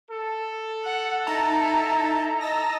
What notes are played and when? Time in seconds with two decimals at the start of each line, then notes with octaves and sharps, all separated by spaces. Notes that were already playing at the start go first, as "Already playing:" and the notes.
0.11 A4
0.84 F#5
1.27 D#4 E4 A5 A#5
2.41 D#5 A5 E6 A#6